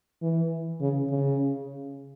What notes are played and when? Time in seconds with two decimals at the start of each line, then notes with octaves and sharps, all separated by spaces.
0.22 E3
0.81 C#3
1.10 C#3